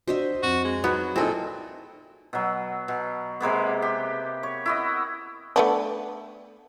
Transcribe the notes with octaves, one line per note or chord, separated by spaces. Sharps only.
D4 F#4 C5 D#5 E5
F2 F#4
G#3
F#3 B3 D#4
A#2 C4 D#4 E4 G#4 A4
B2 F#3
B2
C3 G#3 A#3 B3
G4
C#5
E4 F#4 D#5
A3 B3 D4